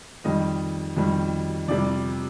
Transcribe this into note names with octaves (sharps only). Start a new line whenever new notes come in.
F2 D#3 G3 D#5
F2 D#3 G3
F2 C3 G3 D5